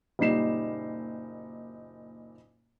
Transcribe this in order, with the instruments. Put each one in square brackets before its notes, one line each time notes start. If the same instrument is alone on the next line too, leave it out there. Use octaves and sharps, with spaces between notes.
[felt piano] F#1 A#2 G3 D#4 C7 E7